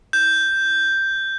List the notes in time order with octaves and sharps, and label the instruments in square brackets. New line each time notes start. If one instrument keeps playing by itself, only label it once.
[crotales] G6